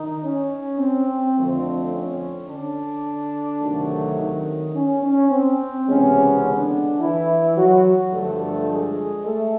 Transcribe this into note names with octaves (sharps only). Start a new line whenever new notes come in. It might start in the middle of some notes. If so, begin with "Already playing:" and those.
Already playing: D#3 D#4
C#4
C4
F2 D3 F3 A3 C4
C#4
D3 D4
D2 C3 D#3 F#3 A3
D#3 D#4
C#4
C#4
C4
C#2 C3 E3 G#3 B3 C#4
D3 D4
E3 E4
F#3 F#4
G2 D3 F3 A3 A4
A3 A4
G#3 G#4
A3 A4